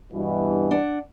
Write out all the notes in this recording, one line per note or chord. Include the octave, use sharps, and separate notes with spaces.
G2 B2 E3
D4 F#5